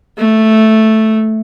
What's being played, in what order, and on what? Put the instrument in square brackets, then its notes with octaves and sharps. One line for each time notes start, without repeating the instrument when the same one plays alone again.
[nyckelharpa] A3